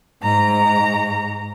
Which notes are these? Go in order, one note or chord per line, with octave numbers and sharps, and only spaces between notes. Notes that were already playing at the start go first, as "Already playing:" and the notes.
G#2 A#5